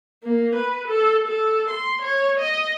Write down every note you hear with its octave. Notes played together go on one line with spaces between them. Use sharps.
A#3
B4
A4
A4
C6
C#5
D#5